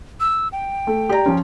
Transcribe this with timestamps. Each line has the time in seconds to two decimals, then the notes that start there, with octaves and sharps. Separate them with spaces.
0.20 E6
0.52 G5
0.87 A3
1.09 G4 D5 A#5
1.26 F3 C#4